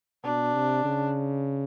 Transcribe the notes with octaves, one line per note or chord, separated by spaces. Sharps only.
B2 D4
C3
C#3